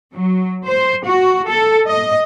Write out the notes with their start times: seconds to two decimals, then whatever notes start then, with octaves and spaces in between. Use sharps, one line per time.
0.16 F#3
0.65 C5
1.04 F#4
1.48 A4
1.88 D#5